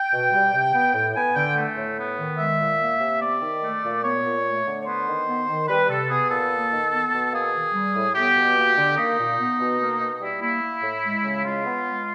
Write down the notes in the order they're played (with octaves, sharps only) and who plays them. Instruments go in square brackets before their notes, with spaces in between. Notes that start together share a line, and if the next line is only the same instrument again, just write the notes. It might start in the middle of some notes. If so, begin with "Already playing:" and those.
Already playing: [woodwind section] G5
B2
G3
C3
B3
A2
B3 G#5
D3 G5
A3
A2
B3
D#3
G#3 E5
A#2
A#3
C3
B3 D5
D#3
A3
A#2
B3 C#5
A#2
A3
D3
C#5
B3 C5
D#3
B3
D#3
G3 B4
C3 A4
B3 G#4
A#2 A4
A#3
D#3
B3
B2
A#3 G#4
D#3
G3
A2
B3 G4
B2
A#3
D3
A#3 D#4
A#2
B3
B2
A#3
B2
G3 E4
A#3 E4
A#3
A2
G#3
C#3
G#3 F4
B3
G#3